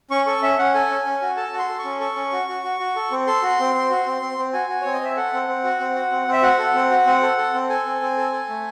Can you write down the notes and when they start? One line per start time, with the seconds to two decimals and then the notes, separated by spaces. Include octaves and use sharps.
0.11 C#4 C#6
0.26 A4 C#6
0.43 C#4 E5
0.59 C#4 F#5
0.74 A4 G#5
0.90 C#4
1.06 C#4
1.22 F#4
1.37 A4 A5
1.53 F#4
1.59 C6
1.69 A4
1.79 C#6
1.85 C#4
2.00 A4 C#6
2.16 C#4
2.32 F#4
2.48 F#4
2.64 F#4
2.80 F#4
2.96 A4
3.11 C4
3.27 A4 C6
3.43 F#4
3.59 C4
3.75 C4
3.90 F#4
4.06 C4
4.22 C4
4.38 C4
4.53 F#4 G#5
4.69 F#4
4.82 C4 C#5
4.93 D#5
5.01 C4 E5
5.16 A4 F#5
5.33 C4
5.48 C4
5.64 F#4
5.80 C4
5.95 F#4
6.11 C4
6.27 C4
6.33 E5
6.43 F#4 F#5
6.59 A4
6.74 C4
6.91 F#4
7.06 C4
7.22 A4
7.38 A4
7.54 C4
7.69 A4 G#5
7.86 C4
8.01 C4
8.17 A4
8.33 A4
8.49 A3